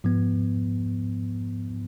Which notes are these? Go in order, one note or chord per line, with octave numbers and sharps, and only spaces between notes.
G#2 F3 B3